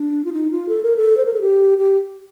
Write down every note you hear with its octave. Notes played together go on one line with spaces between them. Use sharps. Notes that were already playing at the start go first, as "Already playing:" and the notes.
Already playing: D4
F4
D#4
F4
A4
A#4
A4
C5
A#4
A4
G4
G4